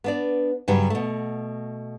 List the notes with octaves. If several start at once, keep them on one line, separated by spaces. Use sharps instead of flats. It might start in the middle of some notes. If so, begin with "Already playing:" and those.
B3 D4 D5
G2 C#3 F#3 G3
B2 A3